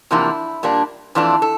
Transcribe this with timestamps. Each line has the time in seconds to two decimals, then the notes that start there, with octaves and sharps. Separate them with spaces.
0.11 E2 C3 F3 A#3 D4 E4
0.63 A#2 G3 A#3 D4
1.15 F2 E3 A3 D4 F4
1.42 A4